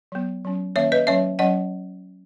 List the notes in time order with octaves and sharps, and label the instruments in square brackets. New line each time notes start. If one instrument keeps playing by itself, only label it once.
[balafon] F#3 B3
F#3 C#4
D#3 A#3 C#4 C#5 E5
B4 D#5
F#3 C#4 C#5 E5
F#3 C#4 D#5 F#5